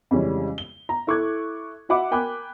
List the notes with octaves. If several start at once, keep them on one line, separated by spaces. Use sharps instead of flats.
F2 C#3 E3 G3 G#3 C#4
G7
A#5
E4 A4 C#6 D6 F#6 G#6
F#4 D#5 E5 F#5 B5 D6
A#4 G5 G#5 B5 D6 F#6